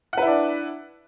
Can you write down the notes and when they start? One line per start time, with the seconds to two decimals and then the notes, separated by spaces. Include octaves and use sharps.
0.13 F#5
0.17 B4
0.22 E4
0.27 D4